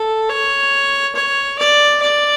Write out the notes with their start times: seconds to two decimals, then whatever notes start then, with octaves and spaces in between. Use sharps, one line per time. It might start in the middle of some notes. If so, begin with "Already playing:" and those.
Already playing: A4
0.30 C#5
1.15 C#5
1.59 D5
2.02 D5